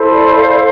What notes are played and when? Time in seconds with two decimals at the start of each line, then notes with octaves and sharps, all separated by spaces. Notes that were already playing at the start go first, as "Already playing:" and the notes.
Already playing: E4 A4 C5
0.12 D5
0.36 F5